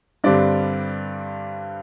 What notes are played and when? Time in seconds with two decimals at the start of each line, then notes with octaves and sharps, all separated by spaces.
0.24 G2 D3 G3 C4 D5